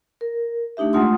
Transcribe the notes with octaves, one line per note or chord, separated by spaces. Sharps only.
A#4
A3 D4 D#4 G4 E5
G#3 A3 F4 F#5 C6 D#6